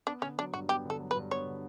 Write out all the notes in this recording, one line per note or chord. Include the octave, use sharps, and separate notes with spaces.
B3 D4
D3 C#4
F#3 D4
G2 F#4
B3 G4
D3
A4
F#3
B4
G2
B3 C#5
D3